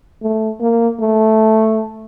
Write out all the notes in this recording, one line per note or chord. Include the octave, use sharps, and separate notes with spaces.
A3
A#3
A3